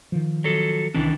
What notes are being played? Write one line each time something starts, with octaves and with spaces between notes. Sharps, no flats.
D#3 F3
F#3 A4
C2 D#3 E3 C#4 D4